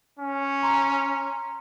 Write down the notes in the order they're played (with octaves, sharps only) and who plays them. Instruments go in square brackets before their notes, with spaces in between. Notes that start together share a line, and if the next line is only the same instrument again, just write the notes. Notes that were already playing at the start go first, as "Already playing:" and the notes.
[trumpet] C#4
[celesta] A#5 C6